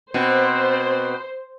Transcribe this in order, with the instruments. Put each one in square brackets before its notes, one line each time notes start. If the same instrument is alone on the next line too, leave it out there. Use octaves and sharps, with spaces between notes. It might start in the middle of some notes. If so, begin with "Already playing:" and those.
[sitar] B2 C4 [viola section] C5